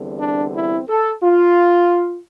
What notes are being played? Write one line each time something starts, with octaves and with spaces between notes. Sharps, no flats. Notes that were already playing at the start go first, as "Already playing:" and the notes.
Already playing: E2 D3 G3 C4
D4
E4
A4
F4